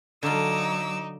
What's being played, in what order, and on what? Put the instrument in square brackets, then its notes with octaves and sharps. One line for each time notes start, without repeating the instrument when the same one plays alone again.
[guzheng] D3 F4 [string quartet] F#3 D6 E6 [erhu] D#4